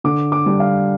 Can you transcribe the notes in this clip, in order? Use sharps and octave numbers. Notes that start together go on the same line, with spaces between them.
D3 D6
D6
G3 D4
F5